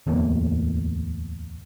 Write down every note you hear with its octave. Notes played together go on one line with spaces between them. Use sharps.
D1 E2 A2 A#3